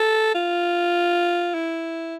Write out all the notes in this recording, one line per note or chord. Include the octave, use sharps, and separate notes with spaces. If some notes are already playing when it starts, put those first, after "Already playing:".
Already playing: A4
F4
E4